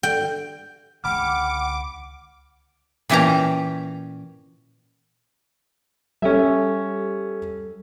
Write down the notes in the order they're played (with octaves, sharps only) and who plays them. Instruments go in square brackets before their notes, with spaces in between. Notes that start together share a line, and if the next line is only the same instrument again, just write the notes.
[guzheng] G5
[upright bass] C#2 D3 [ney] F#5 [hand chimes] G5 B5 F6 [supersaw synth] D6
[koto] A#2 E3 C#4 G4 A5 A#5
[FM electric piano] G3 G4 A4 [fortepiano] C#4 E5